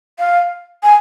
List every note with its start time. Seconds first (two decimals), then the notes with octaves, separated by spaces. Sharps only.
0.19 F5
0.83 G#5